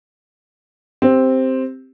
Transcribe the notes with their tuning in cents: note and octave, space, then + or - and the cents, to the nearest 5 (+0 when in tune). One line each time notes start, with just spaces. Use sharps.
C4 +0 G4 +0